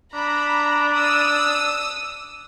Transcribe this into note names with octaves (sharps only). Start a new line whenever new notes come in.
D4 A#5 B5
D#6 E6